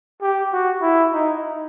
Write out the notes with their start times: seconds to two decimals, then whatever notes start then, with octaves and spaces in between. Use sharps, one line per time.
0.22 G4
0.52 F#4
0.81 E4
1.13 D#4